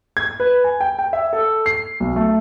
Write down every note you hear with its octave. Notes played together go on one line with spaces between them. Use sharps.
G#6
B4
G#5
G5
G5
E5
A4
C7
B1
A3